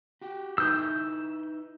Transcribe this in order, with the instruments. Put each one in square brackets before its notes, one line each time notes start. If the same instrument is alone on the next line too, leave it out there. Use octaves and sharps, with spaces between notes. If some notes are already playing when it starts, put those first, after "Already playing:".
[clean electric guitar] F#4 G4
[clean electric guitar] D#4 E4 B4 [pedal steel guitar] E6 G6